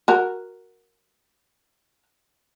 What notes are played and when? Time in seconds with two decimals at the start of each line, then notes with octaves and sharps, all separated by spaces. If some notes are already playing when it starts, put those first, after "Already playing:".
0.08 F#4 A#4